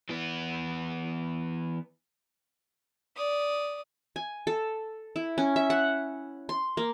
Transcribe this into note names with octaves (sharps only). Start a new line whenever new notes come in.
E3 B3
D5 D#6
G#5
A4
E4
C#4
E5
F#5
C6
A#3